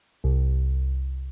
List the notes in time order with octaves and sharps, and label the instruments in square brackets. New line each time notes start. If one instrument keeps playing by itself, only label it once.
[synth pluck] C2